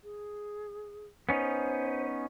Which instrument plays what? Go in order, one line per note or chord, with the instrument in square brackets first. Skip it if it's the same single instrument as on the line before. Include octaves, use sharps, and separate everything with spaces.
[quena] G#4
[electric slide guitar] B3 C#4 D#4 [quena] C5